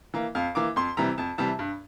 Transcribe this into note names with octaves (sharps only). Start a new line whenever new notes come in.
E3 A#3
F2 F5
E3 A#3 D6
F2 C6
C3 E3 G3 A#5
F2 A5
C3 E3 G3 A5
G2